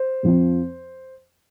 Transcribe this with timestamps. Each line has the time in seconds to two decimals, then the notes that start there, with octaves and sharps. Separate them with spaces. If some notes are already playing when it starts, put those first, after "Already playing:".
Already playing: C5
0.23 F2 F3 C4